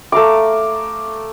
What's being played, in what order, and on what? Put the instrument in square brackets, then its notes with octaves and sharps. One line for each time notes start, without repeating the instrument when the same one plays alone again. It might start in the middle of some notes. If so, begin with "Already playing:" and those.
[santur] A3 F5 A#5 D6